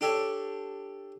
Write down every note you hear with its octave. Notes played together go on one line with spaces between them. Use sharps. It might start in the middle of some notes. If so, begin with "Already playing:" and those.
D4 G4 A4 C#5